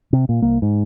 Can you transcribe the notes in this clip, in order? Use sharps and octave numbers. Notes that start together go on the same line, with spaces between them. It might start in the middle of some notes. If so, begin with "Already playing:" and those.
C3
A#2
C2 A#3
G#2